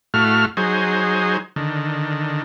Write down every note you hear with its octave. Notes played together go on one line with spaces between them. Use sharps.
A2 A3 F#4 F5 F6
F#3 D#4 G#4 C5
D3 D#3